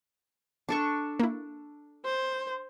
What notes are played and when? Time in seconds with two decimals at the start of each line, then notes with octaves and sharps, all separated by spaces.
0.69 D4 A4 C#6
1.20 A#3 E4
2.05 C5